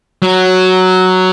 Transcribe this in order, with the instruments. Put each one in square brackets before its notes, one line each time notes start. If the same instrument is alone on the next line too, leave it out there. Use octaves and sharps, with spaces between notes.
[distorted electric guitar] F#3